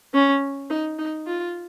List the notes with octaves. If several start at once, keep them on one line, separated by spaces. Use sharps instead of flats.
C#4
D#4
D#4
F4